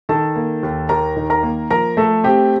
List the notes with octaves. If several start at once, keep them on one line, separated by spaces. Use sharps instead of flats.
D#3 A4 A5
A#3
D#2
D#2 A#4 A#5
D#3
A#4 A#5
A#3
F3 A#4 A#5
A3 A4 A5
C4 G4 G5